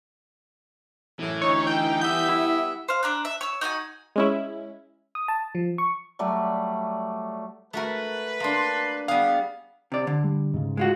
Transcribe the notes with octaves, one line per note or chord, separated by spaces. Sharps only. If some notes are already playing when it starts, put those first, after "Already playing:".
F#2 A2 E3
D2 D#4 C#5
G5
G3 B3 E5 G6
E4
C5 F5
D4 A#5 F#6
E5
C#5 E6
D#4 F#4 F#5 G#5
G#3 C#4 E4
D#6
A5
F3
C#6
F#3 G3 A3 D5
A3 F#4 A#4 B4
A#3 D4 A5 C6
G3 B3 G#4 F5
C3 D5
D3
G3
G#2 C#3
G#3 F4 F#4